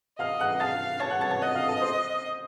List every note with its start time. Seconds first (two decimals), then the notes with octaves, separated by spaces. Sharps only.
0.19 D#5 F5 F6
0.39 F#5 F#6
0.60 F5 A5 A6
1.00 C#5 A5 A6
1.10 F#5 F#6
1.21 A5 A6
1.31 A5 A6
1.42 D#5 F#5 F#6
1.55 F5 F6
1.68 A4 A5
1.81 C5 C6